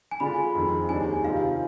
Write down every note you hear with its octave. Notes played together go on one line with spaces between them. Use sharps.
G#5
D3 G#3 D4 F4 B5
F2 D#3 G#3 C4
D#2 D#3 G#3 D4 G#5
C3 D#3 G3 C4 F4 F5